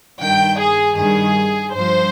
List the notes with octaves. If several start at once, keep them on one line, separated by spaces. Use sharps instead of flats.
G2 D#3 G5
G#4
G2 D#3 G#4
G2 F3 C5